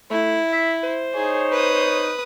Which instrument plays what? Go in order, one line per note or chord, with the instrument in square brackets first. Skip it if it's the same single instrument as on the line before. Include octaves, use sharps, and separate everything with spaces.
[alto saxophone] A3 [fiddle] E4
[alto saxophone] E5
C5
[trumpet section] D#4 C#5 [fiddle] G#4
[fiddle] B4 D#6